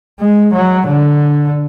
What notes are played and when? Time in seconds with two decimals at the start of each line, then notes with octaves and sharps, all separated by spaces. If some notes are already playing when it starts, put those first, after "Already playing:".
0.20 G#3
0.54 F#3
0.87 D3